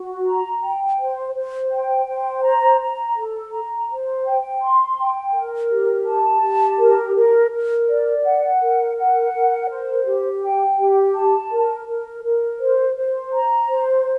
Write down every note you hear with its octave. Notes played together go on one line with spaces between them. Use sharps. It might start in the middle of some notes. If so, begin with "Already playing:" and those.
Already playing: F#4
A#5
G5
C5
C5
G5
C5
A#5
A#5
A4
A#5
C5
G5
C6
G5
A#4
G4
A5
G4
A#4
A#4
A#4
D5
F#5
A#4
F#5
A#4
C5
G4
G5
G4
A5
A#4
A#4
A#4
C5
C5
A#5
C5